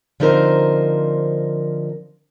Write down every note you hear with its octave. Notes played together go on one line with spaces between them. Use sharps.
D3 F3 C4 D#4 A#4 C5